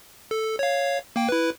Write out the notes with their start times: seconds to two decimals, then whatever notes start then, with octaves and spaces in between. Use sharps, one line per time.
0.31 A4
0.59 C#5 F5
1.16 A#3 G5
1.29 E4 B4